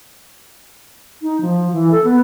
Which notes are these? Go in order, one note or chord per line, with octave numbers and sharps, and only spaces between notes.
D#4
F3
E3
A4
B3